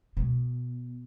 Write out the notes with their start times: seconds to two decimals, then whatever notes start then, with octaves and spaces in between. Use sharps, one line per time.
0.17 B2